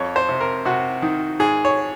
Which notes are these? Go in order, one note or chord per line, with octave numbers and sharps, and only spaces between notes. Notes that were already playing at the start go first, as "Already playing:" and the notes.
Already playing: F2 C#5
C5
C3
A#4
C3 F#4
D#3
G#2 G#4
C#5